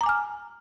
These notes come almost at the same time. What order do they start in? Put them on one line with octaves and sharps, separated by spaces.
A#5 D6 G#5 F6